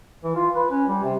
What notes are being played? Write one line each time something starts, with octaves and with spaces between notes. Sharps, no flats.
E3
F4
B4
C#4
G3
C3